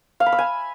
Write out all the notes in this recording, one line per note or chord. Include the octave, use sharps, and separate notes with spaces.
F5
B5
E6
G#5